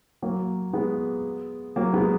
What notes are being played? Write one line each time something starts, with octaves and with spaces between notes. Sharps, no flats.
F#3 A#3
G#3 B3
F#3 A#3
G#3 B3